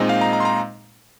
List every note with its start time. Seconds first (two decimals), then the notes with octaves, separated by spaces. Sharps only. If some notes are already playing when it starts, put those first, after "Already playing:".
Already playing: A#2 G#3 C4 D#4 D#5
0.09 F5
0.21 A#5
0.33 A#5
0.40 C6
0.45 A#5